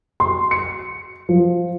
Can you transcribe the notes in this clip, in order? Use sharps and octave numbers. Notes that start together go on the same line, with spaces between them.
C6
C#7
F3